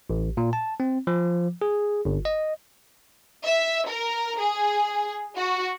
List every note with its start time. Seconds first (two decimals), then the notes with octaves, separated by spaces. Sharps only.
0.10 A1
0.37 A#2
0.53 A5
0.80 C4
1.07 F3
1.62 G#4
2.05 G1
2.25 D#5
3.44 E5
3.87 A#4
4.39 G#4
5.36 F#4